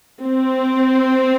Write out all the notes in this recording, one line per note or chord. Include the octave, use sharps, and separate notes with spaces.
C4